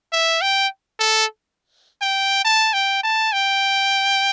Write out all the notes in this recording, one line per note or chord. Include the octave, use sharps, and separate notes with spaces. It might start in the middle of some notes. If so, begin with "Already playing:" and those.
E5
G5
A4
G5
A5
G5
A5
G5